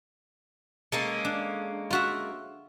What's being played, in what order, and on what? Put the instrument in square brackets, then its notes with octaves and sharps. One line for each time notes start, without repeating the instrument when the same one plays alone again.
[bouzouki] G#3 A#3 C#4 [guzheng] A4
[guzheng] D4
F4 F#4 E5